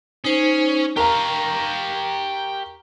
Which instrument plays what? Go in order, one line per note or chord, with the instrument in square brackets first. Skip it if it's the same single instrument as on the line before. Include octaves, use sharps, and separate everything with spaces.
[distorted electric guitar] C#4 [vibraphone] D#4 C5
[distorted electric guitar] G4 F5 [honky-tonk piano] A#4 A#5 [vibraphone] C#6